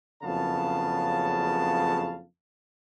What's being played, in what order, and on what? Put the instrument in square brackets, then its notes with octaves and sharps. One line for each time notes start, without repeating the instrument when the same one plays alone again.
[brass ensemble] F#1 F2 C#3 B3 F5 A5